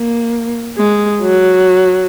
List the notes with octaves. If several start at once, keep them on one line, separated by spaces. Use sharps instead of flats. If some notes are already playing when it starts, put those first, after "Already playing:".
Already playing: A#3
G#3
F#3